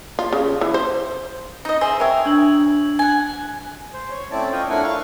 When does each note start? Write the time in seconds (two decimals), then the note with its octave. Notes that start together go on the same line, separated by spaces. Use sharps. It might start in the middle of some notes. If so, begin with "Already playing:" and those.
0.19 F4
0.33 C#3
0.61 E3
0.74 C5
1.65 D#4 D#5
1.81 G#4 C5 E5
2.00 A#4 C#5 E5 G5 E6
2.26 D4 G#6 F#7
2.99 F#5 G#5
3.94 C5
4.11 C#5
4.31 A3 C4 C#4 E4 D5 A5
4.52 F4 C#5 D#5 G5
4.70 A3 D4 E4 A#4 F#5 G#5
4.83 E4 F5 C#6